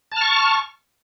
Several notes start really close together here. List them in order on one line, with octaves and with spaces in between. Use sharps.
A5 F6 C#6